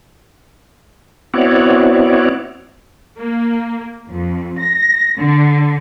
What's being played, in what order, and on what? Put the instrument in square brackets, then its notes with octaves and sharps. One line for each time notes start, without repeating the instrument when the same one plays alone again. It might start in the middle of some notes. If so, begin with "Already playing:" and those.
[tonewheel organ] B3 C4 E4 F#4 C#5 D5
[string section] A#3
F2
A#6
D3